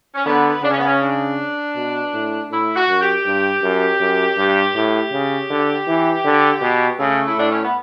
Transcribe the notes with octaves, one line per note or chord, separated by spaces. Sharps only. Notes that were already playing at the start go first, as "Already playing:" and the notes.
C#4
D3 B3
C#3 D4
C#4
B3
C#4
D4
B2
A2
A2 E4
F#4
F#2
G4
G2
F#2
F#2
G2
A2 G4
C#3
D3
E3
D3
B2
C#3 A3
E4
A2 D4
C#4
B3